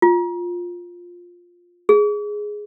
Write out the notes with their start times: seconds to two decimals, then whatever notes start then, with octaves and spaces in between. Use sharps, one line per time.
0.02 F4
1.89 G#4